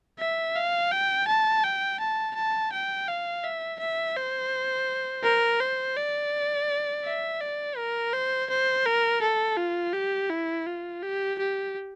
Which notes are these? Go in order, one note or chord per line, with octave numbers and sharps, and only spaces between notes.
E5
F5
G5
A5
G5
A5
A5
G5
F5
E5
E5
C5
A#4
C5
D5
E5
D5
A#4
C5
C5
A#4
A4
F4
G4
E4
F4
G4
G4